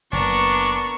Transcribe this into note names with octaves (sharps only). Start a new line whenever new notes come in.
F#1 B3 D4 A#4 C#6